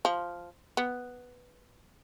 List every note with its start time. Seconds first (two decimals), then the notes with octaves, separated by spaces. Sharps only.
0.05 F3
0.77 B3